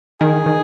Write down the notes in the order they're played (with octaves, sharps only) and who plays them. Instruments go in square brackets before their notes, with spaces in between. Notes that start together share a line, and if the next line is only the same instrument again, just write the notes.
[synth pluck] D#3 [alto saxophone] G#4
[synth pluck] D#3